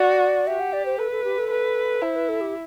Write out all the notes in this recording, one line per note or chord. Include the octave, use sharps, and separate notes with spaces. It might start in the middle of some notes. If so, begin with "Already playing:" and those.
Already playing: F#4 D5
G4 E5
F#5
D5
C5
A4 B4
A4
G4
A4
B4
E4 C5
B4
A4
G4